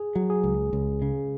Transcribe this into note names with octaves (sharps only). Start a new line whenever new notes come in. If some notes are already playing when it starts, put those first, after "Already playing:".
Already playing: G#4
F#3
G#4
C#2
C#2
C#3